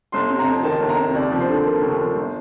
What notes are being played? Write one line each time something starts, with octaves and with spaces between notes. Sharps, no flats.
G1 C6
C3
A#5
F2
D#3 A5
G1
A#5
C3
D#2 D5
F3
C5
D3
A#3
D#2
F3
G1